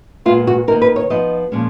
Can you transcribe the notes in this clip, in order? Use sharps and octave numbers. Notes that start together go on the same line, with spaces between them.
A#2 G#3 B3 F4
F#4
D#3 A#3 D#4 A#4
B4
C#5
F3 B3 D#4 D#5
A#2 F3 G#3 C#4